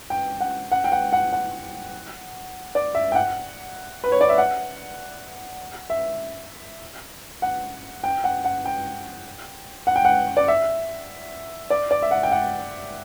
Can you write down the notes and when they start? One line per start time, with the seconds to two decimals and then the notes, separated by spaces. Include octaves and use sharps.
0.10 G5
0.41 F#5
0.72 F#5
0.84 G5
0.92 F#5
1.13 F#5
1.33 F#5
2.75 D5
2.95 E5
3.12 G5
3.15 F#5
4.04 B4
4.12 C#5
4.21 D5
4.29 E5
4.38 F#5
5.90 E5
7.42 F#5
8.04 G5
8.24 F#5
8.45 F#5
8.65 G5
9.87 F#5
9.96 G5
10.05 F#5
10.37 D5
10.48 E5
11.70 D5
11.91 D5
12.02 E5
12.11 F#5
12.23 G5
12.31 F#5